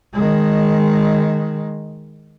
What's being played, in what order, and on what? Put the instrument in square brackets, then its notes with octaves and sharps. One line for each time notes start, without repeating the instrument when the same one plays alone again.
[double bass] D#3 G#3